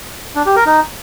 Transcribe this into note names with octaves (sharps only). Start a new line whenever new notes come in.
D4
G4
A#4
D#4